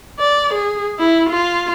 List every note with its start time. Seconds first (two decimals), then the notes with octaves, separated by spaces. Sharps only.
0.20 D5
0.54 G#4
0.99 E4
1.29 F4